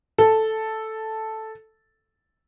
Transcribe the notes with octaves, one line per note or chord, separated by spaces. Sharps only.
A4